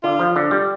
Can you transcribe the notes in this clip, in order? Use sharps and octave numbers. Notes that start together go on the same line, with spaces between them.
D3 F4
F3
D3
G3